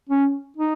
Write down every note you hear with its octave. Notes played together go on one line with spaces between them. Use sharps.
C#4
D#4